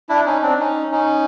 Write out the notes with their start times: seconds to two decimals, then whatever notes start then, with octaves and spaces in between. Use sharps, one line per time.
0.09 D4 E4
0.26 C#4 D#4
0.43 C4 D4
0.60 C#4 D#4
0.92 C#4 D#4